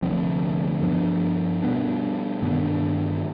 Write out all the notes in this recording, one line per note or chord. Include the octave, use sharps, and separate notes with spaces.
D2 C3 F3 C4
G2 F3 B3 D4
B2 G3 B3 D4
G2 D#3 B3 D4